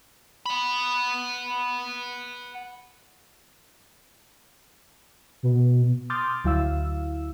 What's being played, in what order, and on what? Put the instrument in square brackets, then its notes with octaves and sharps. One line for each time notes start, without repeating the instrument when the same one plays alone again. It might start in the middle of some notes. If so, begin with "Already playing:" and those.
[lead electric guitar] F#5 B5
[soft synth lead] B2
[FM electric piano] C6 D6 D#6 F6 G6 A6
D2 F#3 E4 F5 E6